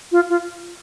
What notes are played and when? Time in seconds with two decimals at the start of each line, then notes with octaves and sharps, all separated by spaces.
0.12 F4
0.30 F4